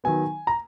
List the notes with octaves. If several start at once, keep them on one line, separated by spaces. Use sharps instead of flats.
D#3 F#3 B3 G#5
A#5